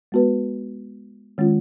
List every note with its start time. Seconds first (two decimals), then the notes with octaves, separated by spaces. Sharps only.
0.12 G#3 B3 F#4 B4
1.38 D#3 G#3 C#4 F4